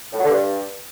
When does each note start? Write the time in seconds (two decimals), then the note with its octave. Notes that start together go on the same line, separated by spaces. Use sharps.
0.12 A2
0.18 F#3
0.24 D3
0.29 G2